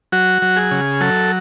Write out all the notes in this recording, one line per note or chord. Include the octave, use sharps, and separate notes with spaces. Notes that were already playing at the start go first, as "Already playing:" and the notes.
F#3 F#4
F#3
G#4
C#3
F#3 A4